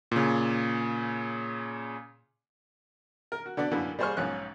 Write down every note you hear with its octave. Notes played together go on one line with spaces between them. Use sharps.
A#2 C#3
A#4
F#4
D3 B3 D4 F#4 D5
F#2 D3 E3 A#3 B3
G3 A#3 G#4 C5 C#6 F6
B1 G#2 F3 C#4 F#6